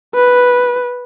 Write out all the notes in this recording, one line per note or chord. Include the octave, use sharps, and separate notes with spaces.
B4